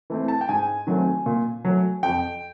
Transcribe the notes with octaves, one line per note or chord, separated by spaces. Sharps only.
E3 A3 C4
A5
G5
G#2 G#5
D#3 F#3 A3 C4
A#2
F#3 A3
F2 G5